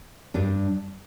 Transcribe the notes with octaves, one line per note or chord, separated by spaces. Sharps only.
G2 G3 D4